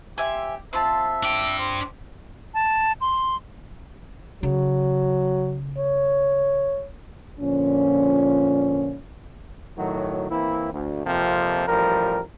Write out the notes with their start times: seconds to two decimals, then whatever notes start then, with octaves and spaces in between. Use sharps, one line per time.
0.18 C4 G4 E5 G#5
0.73 C4 F4 E5 A5
1.23 D4 G5
1.58 C5
2.54 A5
3.01 C6
4.43 C#3 F#3
5.78 C#5
7.40 A#2 D3 F3 C#4
9.78 A2 D#3 F#3
10.31 E3 A#3 C4 E4
10.73 D2
11.05 F2 C3 F3 A#3 C4
11.68 A1 F3 G3 A#4